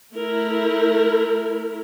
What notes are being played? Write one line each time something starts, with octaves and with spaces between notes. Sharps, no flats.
A3 E4 A#4